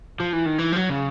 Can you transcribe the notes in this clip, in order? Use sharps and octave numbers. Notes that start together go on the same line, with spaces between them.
F3
E3
D#3
E3
F3
F#3
C#3